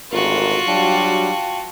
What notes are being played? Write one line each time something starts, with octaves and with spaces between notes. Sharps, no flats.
G#1 D2 F4 F#4 A#4
F#3 G3 D4 F5 G5 A5